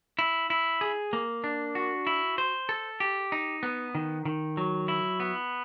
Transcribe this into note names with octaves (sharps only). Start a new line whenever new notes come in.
E4
E4
G#4
A#3
D4
F#4
E4
C5
A4
G4
D#4
B3
D#3
D#3
F#3
E4
B3